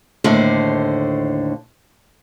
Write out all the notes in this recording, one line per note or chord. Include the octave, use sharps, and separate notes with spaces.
D#2 A2 D3 C5